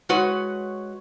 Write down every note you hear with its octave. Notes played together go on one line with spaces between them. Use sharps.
G#3 F#4 B4 C#5